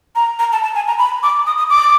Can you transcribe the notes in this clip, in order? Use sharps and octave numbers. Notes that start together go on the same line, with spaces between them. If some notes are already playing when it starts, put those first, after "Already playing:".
A#5
A#5
A5
A5
G#5
A#5
B5
D6
D#6
D#6
D6